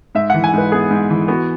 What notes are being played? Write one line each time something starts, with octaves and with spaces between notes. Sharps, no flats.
G#2 E5
E3 F#5
G#5
G#2 B4
B3 G#4
G#2
E3
B3 F#4